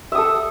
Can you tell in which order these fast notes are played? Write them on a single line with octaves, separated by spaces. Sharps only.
E5 D#6 A4